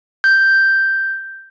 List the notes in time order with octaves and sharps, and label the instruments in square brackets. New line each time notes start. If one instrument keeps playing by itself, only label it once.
[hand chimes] G6